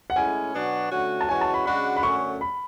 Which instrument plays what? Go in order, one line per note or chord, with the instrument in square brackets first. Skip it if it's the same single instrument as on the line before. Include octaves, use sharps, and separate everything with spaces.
[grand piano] F#5
[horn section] A2 G#3 C#4 E4 [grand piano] G#5
[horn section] B2 F#3 B3 D4 F#4
D3 A3 C#4 F#4
[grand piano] A5
[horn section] E3 G#3 C#4 F#4 [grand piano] G#5
[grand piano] A5
B5
[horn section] C#3 G#3 D4 F#4 [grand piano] B5
[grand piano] B5
[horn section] F#2 D3 F#3 A3 C#4 [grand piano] C#6
[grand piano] B5